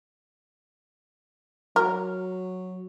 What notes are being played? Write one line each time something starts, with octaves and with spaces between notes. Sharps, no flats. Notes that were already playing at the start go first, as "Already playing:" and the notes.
F#3 A#4